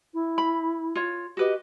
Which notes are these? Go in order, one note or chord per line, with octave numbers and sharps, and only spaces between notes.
E4
B5
F4 C#5
F#4 G4 B4 D#5